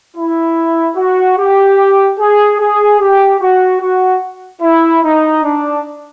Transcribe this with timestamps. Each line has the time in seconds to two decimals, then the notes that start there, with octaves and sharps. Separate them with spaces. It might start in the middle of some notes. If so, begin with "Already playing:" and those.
0.16 E4
0.96 F#4
1.37 G4
2.18 G#4
2.59 G#4
3.00 G4
3.40 F#4
3.80 F#4
4.62 E4
5.03 D#4
5.43 D4